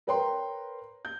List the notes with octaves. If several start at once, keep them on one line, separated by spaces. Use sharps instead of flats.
A#4 B4 C#5 G5 A#5 C6
G6